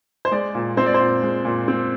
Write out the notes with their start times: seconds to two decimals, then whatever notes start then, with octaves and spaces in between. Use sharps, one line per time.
0.25 C5
0.31 G#3 D5
0.55 A#2
0.77 C4 C5
0.86 D5
0.94 C5
1.00 A#2
1.23 G#3
1.45 A#2
1.68 C4